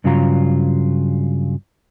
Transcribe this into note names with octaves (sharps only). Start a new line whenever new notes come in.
G2 C#3 F#3 F4 A#5